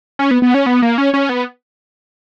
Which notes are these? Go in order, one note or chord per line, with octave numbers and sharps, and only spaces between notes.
C#4
B3
B3
C#4
B3
A#3
C#4
C#4
B3